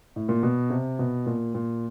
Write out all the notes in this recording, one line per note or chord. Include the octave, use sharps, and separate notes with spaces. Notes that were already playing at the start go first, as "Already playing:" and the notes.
A2
A#2
B2
C3
B2
A#2
A#2